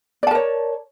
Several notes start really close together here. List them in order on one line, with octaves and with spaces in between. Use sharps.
D5 A5 A#4 C#5